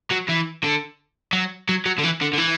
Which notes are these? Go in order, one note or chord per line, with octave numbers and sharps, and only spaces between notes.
F#3
E3
D3
F#3
F#3
F#3
D3
E3
D3
D3
E3